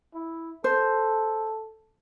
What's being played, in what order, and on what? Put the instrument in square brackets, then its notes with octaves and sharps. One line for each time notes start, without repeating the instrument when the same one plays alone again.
[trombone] E4
[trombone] A4 [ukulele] C5